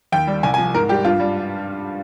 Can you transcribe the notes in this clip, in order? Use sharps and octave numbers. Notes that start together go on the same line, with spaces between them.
D#2 G5
G3
C2 G#5
G#5
F3
G#2 A#4
G3 G4
G2 F4
G3